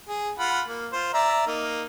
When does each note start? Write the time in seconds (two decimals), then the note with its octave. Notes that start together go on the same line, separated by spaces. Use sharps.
0.08 G#4
0.39 F4 F#5 B5
0.68 A#3
0.93 F4 C5
1.14 D5 E5 A#5
1.47 A#3 D#4